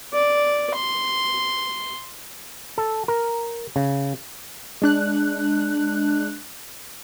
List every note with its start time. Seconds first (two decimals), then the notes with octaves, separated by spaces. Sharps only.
0.13 D5
0.76 C6
2.78 A4
3.08 A#4
3.76 C#3
4.82 G#3 D4 F#6